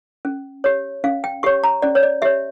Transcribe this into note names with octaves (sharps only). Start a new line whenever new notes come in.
C#4
G4 C#5
C#4 F5
G5
G4 C#5 C#6
A#5
C#4 D5
C#5
D5
G4 C#5 E5